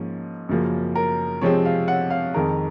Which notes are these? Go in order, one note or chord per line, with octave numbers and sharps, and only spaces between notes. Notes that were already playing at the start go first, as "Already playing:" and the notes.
Already playing: G#2 F3 A#3 C#4
F#2 C#3 F3 A#3
A#4
C3 F3 G#3 C4 C#5
F5
F#5
F5
F2 D#3 G#3 A#4